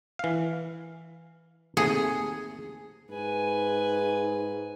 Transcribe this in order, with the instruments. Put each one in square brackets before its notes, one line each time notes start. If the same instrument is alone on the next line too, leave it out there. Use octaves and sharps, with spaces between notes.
[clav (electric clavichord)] E3 F5
[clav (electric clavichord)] D#2 C3 A3 [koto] G#4
[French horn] G#2 [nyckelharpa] B4 G#5